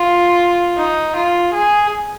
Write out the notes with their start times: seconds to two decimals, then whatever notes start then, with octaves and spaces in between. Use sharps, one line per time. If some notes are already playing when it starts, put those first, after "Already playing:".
Already playing: F4
0.77 D#4
1.16 F4
1.54 G#4